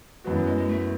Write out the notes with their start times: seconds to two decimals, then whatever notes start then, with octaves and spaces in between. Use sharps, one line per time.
0.24 F#2 E3 G#3 B3 F#4
0.35 F#3
0.46 G#3
0.57 G#3
0.68 A3